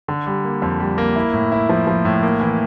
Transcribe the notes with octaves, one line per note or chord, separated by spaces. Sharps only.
D3
G3
A#3
F2
G3
A#3
E4
A2
E4
F3
F3
A2
A#3
E3